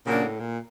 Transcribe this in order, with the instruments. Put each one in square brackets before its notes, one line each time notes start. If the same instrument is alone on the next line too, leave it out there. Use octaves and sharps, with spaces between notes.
[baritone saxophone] A#2 [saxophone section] C#3 F#3 A#3 D4
[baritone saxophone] A2
A#2